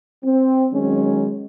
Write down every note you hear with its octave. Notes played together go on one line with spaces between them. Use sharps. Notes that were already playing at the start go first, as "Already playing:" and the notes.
C4
D#3 F#3 G#3 C#4